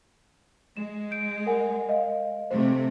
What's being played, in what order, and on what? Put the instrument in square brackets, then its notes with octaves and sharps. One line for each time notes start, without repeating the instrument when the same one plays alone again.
[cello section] G#3 [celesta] E7
[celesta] G6 D7
A#4 F#5 G#5
D#5 F5
[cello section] C3 A3 [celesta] C5